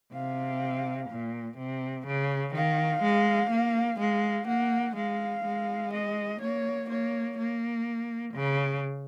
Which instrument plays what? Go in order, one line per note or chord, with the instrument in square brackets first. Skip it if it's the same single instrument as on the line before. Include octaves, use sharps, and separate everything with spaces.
[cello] C3 [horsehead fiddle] F5
[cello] A#2
C3
C#3
[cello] D#3 [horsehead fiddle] F5
[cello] G#3
A#3
[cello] G#3 [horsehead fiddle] F5
[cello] A#3 [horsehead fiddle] F#5
[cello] G#3 [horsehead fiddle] F5
[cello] G#3
[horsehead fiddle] D#5
[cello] A#3 [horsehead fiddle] C#5
[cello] A#3 [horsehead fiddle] C#5
[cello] A#3
C#3